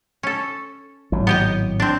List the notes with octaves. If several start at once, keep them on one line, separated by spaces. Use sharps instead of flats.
C#4 A4
G#1 A2 F#3
B3 G4 D#5
C4 D4